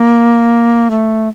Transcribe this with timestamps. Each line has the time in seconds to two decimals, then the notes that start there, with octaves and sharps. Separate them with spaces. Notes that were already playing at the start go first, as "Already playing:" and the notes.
Already playing: A#3
0.90 A3